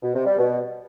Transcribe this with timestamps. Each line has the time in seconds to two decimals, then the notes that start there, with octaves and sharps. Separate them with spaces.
0.02 B2
0.14 C3
0.26 G3
0.38 B2